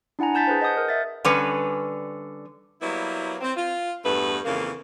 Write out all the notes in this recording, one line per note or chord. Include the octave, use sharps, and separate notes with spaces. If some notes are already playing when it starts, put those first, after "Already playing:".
D4 E4 F#5 G#5 A#5
F#5 A5 G6 A6 B6
G#4 B4 C5
D#5 F#5 D#6 G6
A#4
E5 A6
D3 G3 C#4 B4
F#3 G3 A#3 B3 E4
C4
F4
E2 G2 G3 A3 B3 B4
F2 C#3 E3 A#3